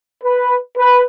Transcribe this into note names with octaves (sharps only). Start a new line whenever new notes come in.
B4
B4